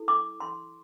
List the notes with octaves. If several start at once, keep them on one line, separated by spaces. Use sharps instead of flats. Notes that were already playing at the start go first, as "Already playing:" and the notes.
Already playing: E4 A4
D6
C6